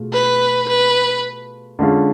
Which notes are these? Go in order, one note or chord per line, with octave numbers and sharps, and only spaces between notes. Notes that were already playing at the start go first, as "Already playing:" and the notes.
Already playing: B2 A3 F4 G#4
B4
B4
D3 G#3 C#4 F4